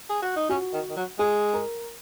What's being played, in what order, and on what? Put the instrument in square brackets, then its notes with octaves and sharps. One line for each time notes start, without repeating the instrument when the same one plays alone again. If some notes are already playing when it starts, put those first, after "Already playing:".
[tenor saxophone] G#4
F#4
D#4
[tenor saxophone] C#4 [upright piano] F#4
[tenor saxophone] D#3
D#3
F#3
[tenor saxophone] G#3 [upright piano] G#4
[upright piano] A#4